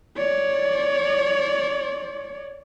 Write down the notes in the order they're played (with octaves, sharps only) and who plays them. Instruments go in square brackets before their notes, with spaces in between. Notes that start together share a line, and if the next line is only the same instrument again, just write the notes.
[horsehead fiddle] C#5 D5